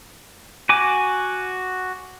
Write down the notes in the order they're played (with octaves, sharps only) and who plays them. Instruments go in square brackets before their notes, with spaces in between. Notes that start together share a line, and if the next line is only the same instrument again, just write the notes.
[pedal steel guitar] F#4 G#5 D6